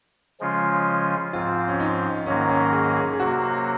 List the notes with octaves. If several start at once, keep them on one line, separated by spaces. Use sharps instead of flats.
C#3 F3 G#3 C#4 F4
G#2 F3 C4 F4
C#4
D#4
G#2 D#3 F#3 A#3 C#4
C#4
G#4
G#4
G#4
C3 F#3 A#3 F#4